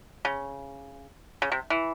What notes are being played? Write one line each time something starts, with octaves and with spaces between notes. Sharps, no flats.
C#3
C#3
C3
E3